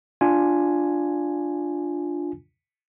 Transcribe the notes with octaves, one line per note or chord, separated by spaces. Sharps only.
D4 F4 G#5